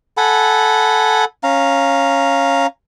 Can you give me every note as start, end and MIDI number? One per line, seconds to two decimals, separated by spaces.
0.17 1.25 69
0.17 1.25 78
0.17 1.25 80
0.17 1.25 83
1.43 2.67 61
1.43 2.67 77
1.43 2.67 82